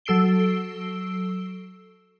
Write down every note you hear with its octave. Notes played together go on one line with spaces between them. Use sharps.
F#3 A4 E6 C7 D7 G7